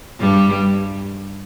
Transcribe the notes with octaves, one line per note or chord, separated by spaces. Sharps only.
G2 G3